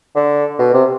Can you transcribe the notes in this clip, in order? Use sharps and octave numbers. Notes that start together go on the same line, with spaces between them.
D3
B2
C3